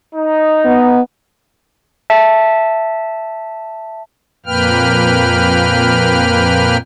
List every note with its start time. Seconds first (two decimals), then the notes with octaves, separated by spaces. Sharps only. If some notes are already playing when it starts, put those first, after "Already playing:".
0.14 D#4
0.65 B3
2.10 E5 A5
4.46 F2 A#2 A#3 B4 G5 F6